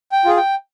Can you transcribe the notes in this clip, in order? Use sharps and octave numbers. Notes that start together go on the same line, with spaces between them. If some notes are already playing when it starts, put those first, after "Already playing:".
G5
F4 G#4
G5